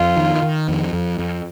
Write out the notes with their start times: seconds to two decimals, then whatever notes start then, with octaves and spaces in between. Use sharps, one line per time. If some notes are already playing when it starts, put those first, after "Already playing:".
Already playing: F2 F4
0.17 D#3
0.42 D#3
0.69 F2
0.93 F2
1.19 F2